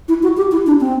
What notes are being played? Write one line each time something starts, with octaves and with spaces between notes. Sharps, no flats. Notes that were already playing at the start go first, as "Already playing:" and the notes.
E4
F#4
G4
E4
D4
C4